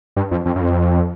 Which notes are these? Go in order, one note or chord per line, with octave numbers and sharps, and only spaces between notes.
G2
F2
F2
F#2
F2